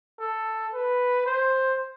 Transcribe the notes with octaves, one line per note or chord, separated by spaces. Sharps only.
A4
B4
C5